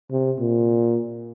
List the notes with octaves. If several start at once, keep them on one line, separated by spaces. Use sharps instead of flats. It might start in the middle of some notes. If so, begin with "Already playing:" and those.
C3
A#2